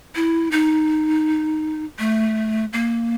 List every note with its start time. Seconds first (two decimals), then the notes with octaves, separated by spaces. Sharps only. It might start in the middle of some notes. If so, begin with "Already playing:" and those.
0.15 E4
0.51 D#4
1.99 A3
2.73 A#3